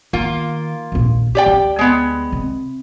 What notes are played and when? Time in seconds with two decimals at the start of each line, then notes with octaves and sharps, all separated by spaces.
0.13 D#3 A#3 F4
0.92 A#1 D#2
1.35 G4 D5 G5
1.46 D2
1.79 G#3 B3
2.32 C3